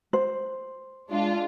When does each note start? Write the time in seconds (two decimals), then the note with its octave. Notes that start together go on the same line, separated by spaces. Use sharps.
0.13 C5
1.08 G#3 D4 F4